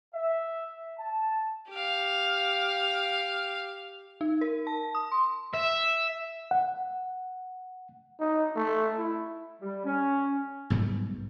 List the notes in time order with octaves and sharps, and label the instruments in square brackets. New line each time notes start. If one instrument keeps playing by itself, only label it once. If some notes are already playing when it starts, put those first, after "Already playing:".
[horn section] E5
A5
[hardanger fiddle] G4 F5
[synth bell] D#4
A#4
A5
D#6
C6
[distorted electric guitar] E5
[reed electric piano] F#5
[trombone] D#4
A3
E4
[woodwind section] G3
C#4
[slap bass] B1 G#2 G3 B3